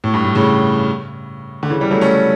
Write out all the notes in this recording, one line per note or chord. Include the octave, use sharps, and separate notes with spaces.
A2
G2
A2
A2 C#3
D3
C#3 E3
E3 G3
F#3 A3
A3 C#4